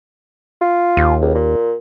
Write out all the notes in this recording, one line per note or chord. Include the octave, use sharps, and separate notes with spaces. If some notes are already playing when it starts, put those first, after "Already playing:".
F4
D#2
C#2
A#2